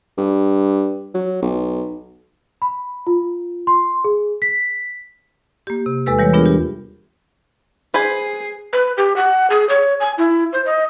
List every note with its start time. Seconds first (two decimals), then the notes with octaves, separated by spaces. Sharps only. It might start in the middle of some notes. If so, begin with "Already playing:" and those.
0.18 G2
1.14 F#3
1.42 B1
2.62 B5
3.07 F4
3.67 C6
4.04 G#4
4.42 B6
5.67 A#3 G4
5.86 C3
6.06 E2 G#3 A4 B4 E6
6.19 E3 G3 B4 C#5
6.33 B3 D4 F4 G#4 A#4
6.45 G4
7.94 G#4 B4 C5 G#5 C7
8.73 B4
8.98 G4
9.16 F#5
9.50 G#4
9.69 C#5
10.00 G#5
10.18 E4
10.53 C5
10.66 D#5